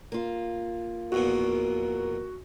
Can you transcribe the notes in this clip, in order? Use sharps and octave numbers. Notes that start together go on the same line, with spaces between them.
A#3 F4
A#1 E2 B2 F#4 A#4